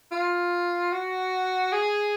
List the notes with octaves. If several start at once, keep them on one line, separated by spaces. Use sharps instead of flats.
F4
F#4
G#4